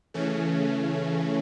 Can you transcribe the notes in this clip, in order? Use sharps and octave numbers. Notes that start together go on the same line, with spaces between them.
C#3 E3 A3 C#4